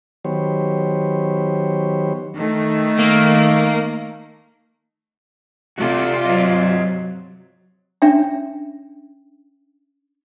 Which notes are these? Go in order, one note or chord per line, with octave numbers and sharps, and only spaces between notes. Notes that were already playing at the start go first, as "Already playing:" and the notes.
D#3 F#3 B3 G4 C5 C#5
D#3 A3
A#3
C3 F4 F#4 A4 D5
F#3 C5 D#5
C#4 D4 E5 G5